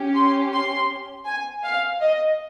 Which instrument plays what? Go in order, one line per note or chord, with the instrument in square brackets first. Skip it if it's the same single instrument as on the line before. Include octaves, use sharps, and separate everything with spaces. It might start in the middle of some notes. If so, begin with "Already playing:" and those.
Already playing: [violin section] C#4 G4
C6
C6
G#5
F5
D#5